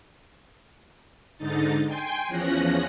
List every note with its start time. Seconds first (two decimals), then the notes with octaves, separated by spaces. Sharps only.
1.38 G#2 D3 D#4 A6
1.87 G5 G#5 C6 G6
2.27 E2 F3 C#4 F#6 A#6